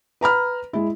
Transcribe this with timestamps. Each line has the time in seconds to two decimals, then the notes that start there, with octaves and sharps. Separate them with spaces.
0.21 B4 A#5 B5 F6
0.73 G#3 E4